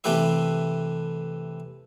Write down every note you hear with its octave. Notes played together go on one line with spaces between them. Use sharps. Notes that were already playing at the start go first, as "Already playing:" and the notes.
C3 E3 A3 G4 B4 E5